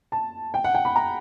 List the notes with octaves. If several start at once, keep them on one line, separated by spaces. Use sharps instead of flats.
A5
G5
F#5
G5
B5
A#5